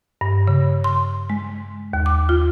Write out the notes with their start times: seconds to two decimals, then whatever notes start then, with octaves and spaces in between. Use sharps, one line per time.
0.21 G2
0.48 C#3
0.84 C6
1.30 G#3
1.93 D#2
2.06 D6
2.29 F4